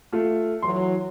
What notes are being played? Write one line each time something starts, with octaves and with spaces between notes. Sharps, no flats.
A3 F4
E3 F#3 C6